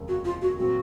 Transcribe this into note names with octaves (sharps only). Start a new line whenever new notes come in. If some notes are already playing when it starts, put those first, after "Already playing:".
Already playing: F1 D#2 C#3 G#3
F#4
F4
F#4
A#2 F#3 C4 F#4